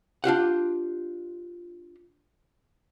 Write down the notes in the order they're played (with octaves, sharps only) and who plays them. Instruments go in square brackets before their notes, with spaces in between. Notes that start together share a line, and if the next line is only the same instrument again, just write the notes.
[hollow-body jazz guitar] D4 F4 G4 F#5